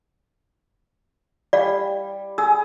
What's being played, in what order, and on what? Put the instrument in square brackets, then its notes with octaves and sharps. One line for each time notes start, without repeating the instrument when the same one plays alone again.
[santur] G3 [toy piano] D5 F5
[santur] G#4 [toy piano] E6